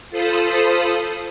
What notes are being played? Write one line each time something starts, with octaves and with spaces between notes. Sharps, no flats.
F4 A4 C5 B5 D#6